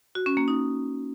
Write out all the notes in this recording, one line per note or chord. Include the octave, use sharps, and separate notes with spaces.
F#4
C#4
A#3
D#4